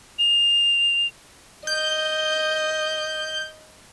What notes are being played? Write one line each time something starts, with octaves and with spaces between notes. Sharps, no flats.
F7
D#5 G6